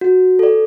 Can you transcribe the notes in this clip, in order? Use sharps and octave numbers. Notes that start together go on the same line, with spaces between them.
F#4
A4 D5